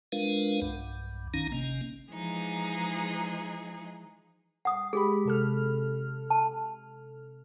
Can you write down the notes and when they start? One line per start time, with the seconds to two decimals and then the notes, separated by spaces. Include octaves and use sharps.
0.12 G#3 D4 F4 A#4 B4 F5
0.62 B1 G2
1.34 A#1 D#3 C#4 D#4 A#5
1.52 G#1 C3 A#3 C#4
2.11 E3 F3 G#3 D#4 G#4
4.65 F#5 D#6
4.93 G#3 G4 G#4 B5
5.25 C3 A4 F6
6.30 A5